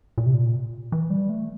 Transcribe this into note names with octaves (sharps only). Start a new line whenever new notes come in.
A#2
C3
A#2
E3
G3
A3